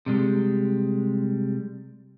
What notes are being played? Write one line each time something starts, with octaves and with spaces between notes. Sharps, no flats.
C3 G3 G#3